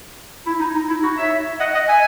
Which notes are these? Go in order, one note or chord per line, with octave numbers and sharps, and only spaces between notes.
E4
D#4
D#4
E4
D#4 F#4
C#5 E5
D#5 F#5
D#5 F#5
E5 G#5